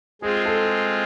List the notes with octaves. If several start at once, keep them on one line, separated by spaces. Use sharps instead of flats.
G#3 C4 F4 G#4
A4